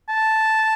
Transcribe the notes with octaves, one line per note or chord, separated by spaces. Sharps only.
A5